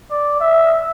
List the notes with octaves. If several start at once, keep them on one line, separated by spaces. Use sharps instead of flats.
D5
E5